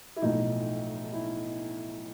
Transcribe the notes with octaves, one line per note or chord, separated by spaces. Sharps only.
E4
B1 A2 F3 D#4
E4